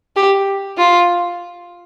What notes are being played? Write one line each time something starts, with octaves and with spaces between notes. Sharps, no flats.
G4
F4